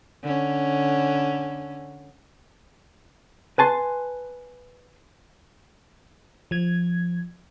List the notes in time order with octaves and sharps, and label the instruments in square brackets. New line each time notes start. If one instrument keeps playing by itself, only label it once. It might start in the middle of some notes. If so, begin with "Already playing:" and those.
[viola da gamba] D3 C#4
[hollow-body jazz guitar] B4 G#5 A5 C6
[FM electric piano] F3 G#6